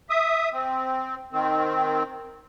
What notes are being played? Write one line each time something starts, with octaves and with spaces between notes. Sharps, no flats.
E5 D#6
C4
D#3 C4